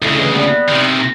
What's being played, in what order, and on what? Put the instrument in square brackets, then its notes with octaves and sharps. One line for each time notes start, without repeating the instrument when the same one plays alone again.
[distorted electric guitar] D2 C#3 [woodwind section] E4 A4 D#5
[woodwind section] C#2 E3 D#5
G3 B3
[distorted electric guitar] C3 D#3